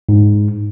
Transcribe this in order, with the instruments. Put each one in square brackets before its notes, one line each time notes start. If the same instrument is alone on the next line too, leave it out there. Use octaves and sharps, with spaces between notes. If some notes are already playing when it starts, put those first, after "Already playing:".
[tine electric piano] G#2